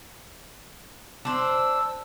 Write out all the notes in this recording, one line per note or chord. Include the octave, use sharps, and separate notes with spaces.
D4 C5 E6